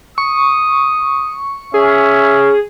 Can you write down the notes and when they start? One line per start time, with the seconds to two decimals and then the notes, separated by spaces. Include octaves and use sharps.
0.18 C#6 D#6
1.74 C#4 G#4 E5